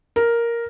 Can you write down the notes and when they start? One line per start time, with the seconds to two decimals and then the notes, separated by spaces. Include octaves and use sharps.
0.16 A#4